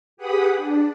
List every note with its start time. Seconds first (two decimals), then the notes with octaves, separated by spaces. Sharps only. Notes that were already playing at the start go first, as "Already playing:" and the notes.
0.17 G4 G#4 B4 F#5 B5 D#6
0.57 D4